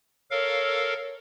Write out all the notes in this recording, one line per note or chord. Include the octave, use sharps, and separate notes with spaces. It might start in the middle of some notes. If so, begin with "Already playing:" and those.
A4 A#4 C#5 F5